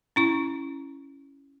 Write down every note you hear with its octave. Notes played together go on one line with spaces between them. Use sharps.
C#4 E4 C#6